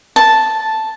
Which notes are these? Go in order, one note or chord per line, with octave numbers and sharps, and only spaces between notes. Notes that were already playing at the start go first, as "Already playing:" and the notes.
A5